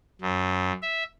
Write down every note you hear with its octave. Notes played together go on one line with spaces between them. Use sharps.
F#2
E5